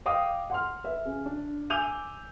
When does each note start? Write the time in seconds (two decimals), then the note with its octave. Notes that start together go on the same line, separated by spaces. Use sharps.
0.06 D#5 F5 G5 D6 D#6
0.50 F#5 C6 F6
0.84 B4 E5
1.05 C#3
1.26 D4
1.70 G#5 D6 E6 G6 D#7 F7